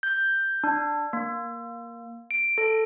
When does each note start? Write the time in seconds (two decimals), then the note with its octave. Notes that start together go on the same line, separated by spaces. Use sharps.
0.03 G6
0.64 D4
1.13 A#3
2.31 D7
2.58 A4